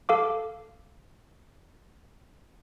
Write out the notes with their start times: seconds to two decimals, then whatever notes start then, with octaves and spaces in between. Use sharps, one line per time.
0.09 A4 F5 D6